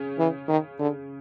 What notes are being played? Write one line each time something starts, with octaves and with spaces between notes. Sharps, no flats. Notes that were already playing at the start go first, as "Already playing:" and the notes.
Already playing: C#3 C#4
E3
D#3
D3